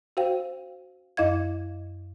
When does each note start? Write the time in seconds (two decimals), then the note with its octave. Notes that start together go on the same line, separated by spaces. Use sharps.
0.17 F#4 C5 F5 G5
1.17 F#2 E4 D#5 F5 G#6